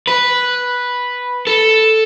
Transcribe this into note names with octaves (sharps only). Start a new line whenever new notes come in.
B4
A4